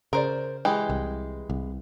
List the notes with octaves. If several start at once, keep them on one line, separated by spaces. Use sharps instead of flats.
C#3 A#4 C5 D5
E3 G#3 G4
C2
C2